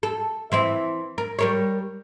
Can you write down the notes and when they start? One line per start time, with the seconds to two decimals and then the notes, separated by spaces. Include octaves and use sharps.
0.03 A4
0.52 E3 C4 E4
1.18 A#4
1.39 G3 A#4 C#5